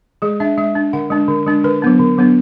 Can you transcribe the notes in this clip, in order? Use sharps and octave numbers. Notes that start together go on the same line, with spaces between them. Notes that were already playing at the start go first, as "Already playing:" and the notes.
G#3 G#4
D4 E5
G#3 E5
D4
D3 F#5
G#3 D4
D3
G#3 D4
D3 B4
F#3 B3 D4
D3
F#3 B3 D4